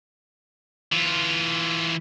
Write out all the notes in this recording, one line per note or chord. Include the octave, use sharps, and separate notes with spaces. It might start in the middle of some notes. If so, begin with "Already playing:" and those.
E3 F4